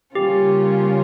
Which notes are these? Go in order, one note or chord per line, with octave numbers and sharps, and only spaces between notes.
C#3 G3 A#3 C#4 F4 G4